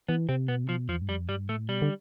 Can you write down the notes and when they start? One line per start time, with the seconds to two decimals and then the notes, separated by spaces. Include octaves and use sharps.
0.08 E3 B3
0.29 C3 C4
0.48 B2 B3
0.64 C3
0.69 B2 F3
0.89 E2 F3
1.02 G2
1.09 F2 G3
1.29 G2 G3
1.49 A2 A3
1.69 B2 G3
1.82 D3